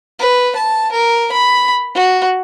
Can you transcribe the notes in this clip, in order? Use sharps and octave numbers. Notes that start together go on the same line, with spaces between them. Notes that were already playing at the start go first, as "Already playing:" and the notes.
B4
A5
A#4
B5
F#4